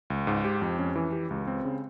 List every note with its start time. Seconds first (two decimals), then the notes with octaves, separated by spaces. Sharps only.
0.10 C#2
0.27 G#2
0.45 G4
0.62 F2
0.79 C#4
0.96 E3
1.13 G4
1.31 C#2
1.47 C4
1.65 C#3